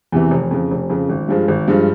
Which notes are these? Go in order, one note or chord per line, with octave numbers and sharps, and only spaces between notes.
E2 C3 E3
F1
F2 C#3
F1
F2 C#3
G#1
G2 F3 G#3
G#1
G2 F3 G#3